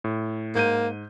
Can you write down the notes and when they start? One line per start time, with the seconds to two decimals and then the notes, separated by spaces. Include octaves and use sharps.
0.04 A2
0.55 G#2 A#3 G6 D#7